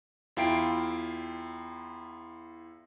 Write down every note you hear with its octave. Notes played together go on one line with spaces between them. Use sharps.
E2 E4 F4 G5 C7 D7